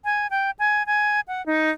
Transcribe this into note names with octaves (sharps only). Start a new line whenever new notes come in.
G#5
G5
G#5
G#5
F#5
D#4